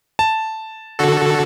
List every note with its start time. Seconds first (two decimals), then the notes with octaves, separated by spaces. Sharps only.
0.19 A5
0.99 D3 F#4 A4